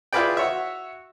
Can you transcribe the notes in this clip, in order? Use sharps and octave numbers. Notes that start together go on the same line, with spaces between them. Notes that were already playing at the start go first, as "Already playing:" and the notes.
E4 F4 G#4 B4 D5 G5
F#4 C#5 E5